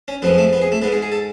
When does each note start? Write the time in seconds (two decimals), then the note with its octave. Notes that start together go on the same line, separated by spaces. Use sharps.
0.08 C#4
0.22 F2 F3 G#3 B3
0.38 A3
0.53 B3
0.62 G#4
0.72 A3
0.82 G#2 G#3 B3
0.92 G#4
1.02 G#4
1.12 A4